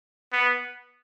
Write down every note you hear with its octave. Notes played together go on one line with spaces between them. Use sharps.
B3